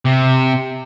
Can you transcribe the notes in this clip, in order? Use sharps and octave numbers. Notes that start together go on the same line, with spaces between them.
C3